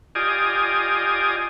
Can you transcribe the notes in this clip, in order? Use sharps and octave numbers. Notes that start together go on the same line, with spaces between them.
F4 G4 D5 D#5 G#5 D#6